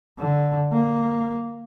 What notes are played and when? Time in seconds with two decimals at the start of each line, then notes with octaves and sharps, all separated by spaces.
0.19 D3
0.73 A#3